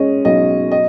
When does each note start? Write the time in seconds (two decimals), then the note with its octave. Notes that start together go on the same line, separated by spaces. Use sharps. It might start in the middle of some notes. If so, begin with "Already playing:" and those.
Already playing: G#3 C#4 D#5
0.25 B1 D#5
0.72 D#5